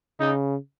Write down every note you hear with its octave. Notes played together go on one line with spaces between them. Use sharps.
C#3 D#4